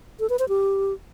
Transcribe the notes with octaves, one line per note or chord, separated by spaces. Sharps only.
A4
B4
C5
G4